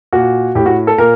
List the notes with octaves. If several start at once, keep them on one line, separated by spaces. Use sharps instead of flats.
A#2 F#4
A2 G4
F#4
A4
A#2 A#4